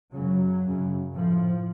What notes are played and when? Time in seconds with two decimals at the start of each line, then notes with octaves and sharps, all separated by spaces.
0.13 F#2 C#3 F#3
0.63 F#2 C#3
1.13 A2 F3